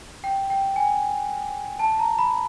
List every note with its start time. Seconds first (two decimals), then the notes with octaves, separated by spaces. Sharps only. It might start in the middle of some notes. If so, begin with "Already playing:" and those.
0.24 G5
0.50 G5
0.76 G#5
1.79 A5
1.99 A#5
2.19 B5